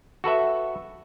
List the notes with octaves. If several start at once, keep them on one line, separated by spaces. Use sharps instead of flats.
F#4 A4 B4 E5